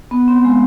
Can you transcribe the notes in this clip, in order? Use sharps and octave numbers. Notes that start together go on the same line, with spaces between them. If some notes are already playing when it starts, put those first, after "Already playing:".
B3
C4
G#3